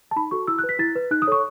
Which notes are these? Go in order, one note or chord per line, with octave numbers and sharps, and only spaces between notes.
A5
D#4 B5
F#4 A4 C#6
E4 E6
F#6
B4
B6
E4 A6
B4
D#4 F#6
D#6
A4 C#5 C#6